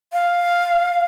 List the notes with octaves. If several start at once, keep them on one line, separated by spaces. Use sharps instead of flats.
F5